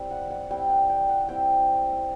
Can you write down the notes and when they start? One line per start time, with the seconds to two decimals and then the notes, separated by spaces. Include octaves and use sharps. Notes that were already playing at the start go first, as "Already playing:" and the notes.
Already playing: G3 C4 E4
0.11 F#5
0.30 F#5
0.51 G3 C4 E4 G5
0.69 F#5
0.89 G5
1.09 F#5
1.28 G3 C4 E4 G5